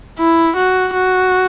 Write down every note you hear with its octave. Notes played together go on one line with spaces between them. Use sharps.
E4
F#4
F#4